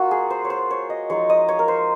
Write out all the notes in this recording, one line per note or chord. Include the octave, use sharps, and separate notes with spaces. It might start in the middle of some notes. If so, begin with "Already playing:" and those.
Already playing: A#3 F4 F#4
G#4
C5
C#5
C5
C#5
D#5
F3 G#3 D#4 C#5
D#5
C#5
A#4
C5